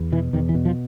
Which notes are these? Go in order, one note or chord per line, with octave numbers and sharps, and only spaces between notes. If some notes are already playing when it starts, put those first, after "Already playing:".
Already playing: E2
B2 E3
E2 D#3
E3
B2
F3